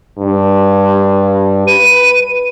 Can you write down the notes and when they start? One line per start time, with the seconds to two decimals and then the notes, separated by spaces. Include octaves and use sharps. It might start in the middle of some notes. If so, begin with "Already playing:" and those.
0.18 G2
1.67 B4 D#7